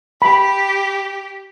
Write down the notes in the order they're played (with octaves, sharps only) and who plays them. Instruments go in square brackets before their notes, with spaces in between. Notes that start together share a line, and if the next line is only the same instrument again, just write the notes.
[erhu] G4 [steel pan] B5